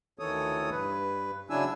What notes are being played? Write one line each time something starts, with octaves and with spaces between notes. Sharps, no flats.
D2 D#3 E3 A4 C#5 D#6
G2 B4
C#3 F#3 D4 E4 G#5 E6